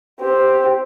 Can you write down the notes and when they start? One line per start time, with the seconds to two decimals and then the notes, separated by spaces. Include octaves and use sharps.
0.20 C4 G4